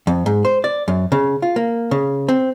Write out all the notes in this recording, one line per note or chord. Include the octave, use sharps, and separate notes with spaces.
F2
G#2
C5
D5
F#2
C#3
F4
A#3
C#3
C4